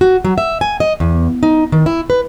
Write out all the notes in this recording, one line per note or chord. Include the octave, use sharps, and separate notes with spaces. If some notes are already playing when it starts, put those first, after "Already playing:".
F#4
F#3
E5
G#5
D#5
E2
D#4
D#3
E4
B4